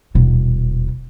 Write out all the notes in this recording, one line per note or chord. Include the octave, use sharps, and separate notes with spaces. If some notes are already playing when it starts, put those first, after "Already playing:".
D#1 B2